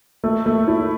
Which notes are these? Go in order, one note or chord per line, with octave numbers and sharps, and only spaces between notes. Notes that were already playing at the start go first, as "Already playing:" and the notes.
A3
A3
E4